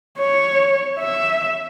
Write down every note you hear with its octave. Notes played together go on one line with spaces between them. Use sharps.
C#5
E5